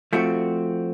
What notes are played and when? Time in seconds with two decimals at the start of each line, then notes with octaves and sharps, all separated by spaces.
0.13 F3 A3 C4 F#4